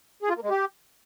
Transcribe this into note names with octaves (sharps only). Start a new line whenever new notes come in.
G#4
F4
A#3
G#3
G4